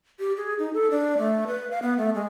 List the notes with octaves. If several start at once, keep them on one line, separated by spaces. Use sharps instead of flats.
G4
G#4
D#4
A4
D4
A3
B4
F5
B3
A3
G#3